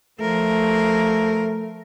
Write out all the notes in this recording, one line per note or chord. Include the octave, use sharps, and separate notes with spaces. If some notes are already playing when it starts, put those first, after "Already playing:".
F3 A3 A#4